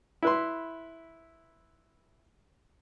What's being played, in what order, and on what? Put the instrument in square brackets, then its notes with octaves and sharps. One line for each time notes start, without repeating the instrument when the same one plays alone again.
[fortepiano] E4 B4 C6